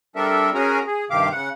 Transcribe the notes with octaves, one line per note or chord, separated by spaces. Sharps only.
G3 C4 D4 A4 A#4 E5
C#4 F#4 G#4 A#4 G#5 A#5
G#4
G2 C3 D#3 G4 F5 D6
C#3 F#5